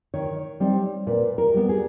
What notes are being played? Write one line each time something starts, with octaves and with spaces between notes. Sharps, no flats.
D#3 C#5
G3 C4 D#4
A#2 B4
A#4
G3 B3
G#4